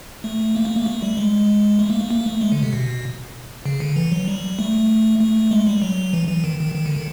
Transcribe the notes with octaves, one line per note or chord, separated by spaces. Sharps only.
A3
A#3
A3
A#3
A3
G3
G#3
A3
A#3
A3
A#3
A3
G#3
D3
C3
B2
C#3
D3
E3
F#3
G3
A3
A3
G#3
G3
F#3
E3
E3
D#3
D#3
D#3
D3
D#3